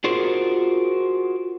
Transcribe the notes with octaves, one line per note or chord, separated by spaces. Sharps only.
F4 F#4 G#4 A#4 C5